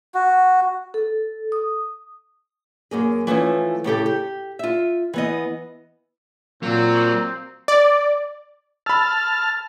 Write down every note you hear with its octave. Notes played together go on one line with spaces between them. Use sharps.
F#4
A4
D#6
F#2 A#3 G#4
E3 F3 A3 C#4
A2 C#3 G4 A4
G4
F4 E5
E3 B3 D#5
A#2 F#3 A#3 C4
D5
A5 B5 E6 F6